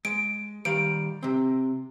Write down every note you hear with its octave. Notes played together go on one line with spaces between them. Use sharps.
G#3 D7
D#3 G3 F5 D7
C3 C4